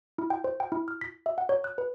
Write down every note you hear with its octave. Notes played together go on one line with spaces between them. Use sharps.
E4
G5
C5
G5
E4
F6
B6
E5
F#5
C#5
F#6
B4